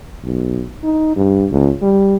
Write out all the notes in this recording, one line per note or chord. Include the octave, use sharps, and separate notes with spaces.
B1
D#4
G2
C#2
G3